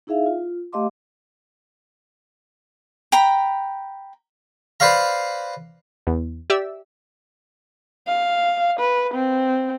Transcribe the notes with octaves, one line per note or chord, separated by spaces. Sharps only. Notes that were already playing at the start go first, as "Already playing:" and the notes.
D#4 E4 G#4 E5 F5
F4
A3 G4 D#5 F5 C6 D6
G5 A#5 B5
B4 C5 D5 F5 A#5
E2
G4 D5 E5 E6
F5
B4
C4